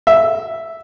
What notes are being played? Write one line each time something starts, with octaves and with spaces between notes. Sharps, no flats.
E5